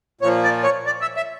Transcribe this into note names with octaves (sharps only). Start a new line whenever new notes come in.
A#2 F3 C#5
D5
C#5
D5
E5
E5